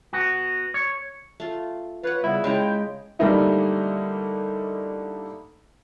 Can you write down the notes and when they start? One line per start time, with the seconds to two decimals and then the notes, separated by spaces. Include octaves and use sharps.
0.13 B3 F#4
0.74 C#5
1.40 A3 F4
2.03 F4 B4 C#5 F#5
2.24 C#3 G3 B3 E4
2.44 C#3 G#3 E4 G5 A5 A#5
3.19 D3 G3 A3 A#3 D#4 E4